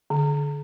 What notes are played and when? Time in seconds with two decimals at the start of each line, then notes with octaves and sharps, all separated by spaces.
0.10 D3